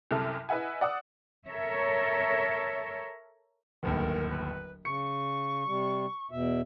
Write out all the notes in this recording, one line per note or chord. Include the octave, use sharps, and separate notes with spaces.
C2 F#2 C3 E4 A4 F6
E4 B4 D#5 E5 F#5 G#5
D5 F#5 D#6 E6
A4 A#4 C#5 E5
D1 G1 D#2 A#4
B4
C#3 C#6 C#7
C3 G3
E2 B2 E5